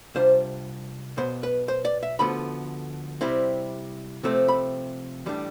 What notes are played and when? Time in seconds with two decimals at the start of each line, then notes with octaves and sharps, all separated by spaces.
0.15 C2 C3 G3 D4 F4 C5
1.17 B1 B2 B3 C5
1.43 B4
1.68 C5
1.85 D5
2.03 E5
2.19 D2 D3 F3 B3 B5
3.21 C3 G3 C4 E4
4.23 C3 F3 A3 C4
4.48 B5
5.26 A2 E3 G3 D4